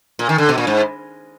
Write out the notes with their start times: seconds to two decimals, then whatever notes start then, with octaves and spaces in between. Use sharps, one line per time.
0.19 A#2
0.29 D#3
0.38 D3
0.49 B2
0.58 A#2
0.67 G#2